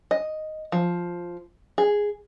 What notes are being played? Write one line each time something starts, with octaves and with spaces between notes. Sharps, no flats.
D#5
F3
G#4